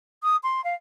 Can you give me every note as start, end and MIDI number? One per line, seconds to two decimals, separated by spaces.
0.23 0.36 87
0.43 0.63 84
0.64 0.74 77